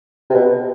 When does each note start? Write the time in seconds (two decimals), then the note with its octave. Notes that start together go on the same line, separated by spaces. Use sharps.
0.30 C3
0.34 B2